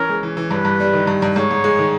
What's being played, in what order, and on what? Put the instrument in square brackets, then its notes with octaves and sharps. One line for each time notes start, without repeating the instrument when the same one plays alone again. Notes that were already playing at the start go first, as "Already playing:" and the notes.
Already playing: [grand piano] E3 C#4 [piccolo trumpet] A#4
[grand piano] G#3
E3
E3
[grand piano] G2 [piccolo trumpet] B4
[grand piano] G2
G3
D#3
G2
G2
[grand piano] G#2 [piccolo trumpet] C#5
[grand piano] G#2
G#3
D#3